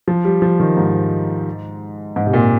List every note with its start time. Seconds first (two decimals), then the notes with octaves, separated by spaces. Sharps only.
0.08 F3
0.25 G3
0.42 F3
0.60 D#3
0.77 G#2
2.16 G#2
2.26 C3
2.33 A#2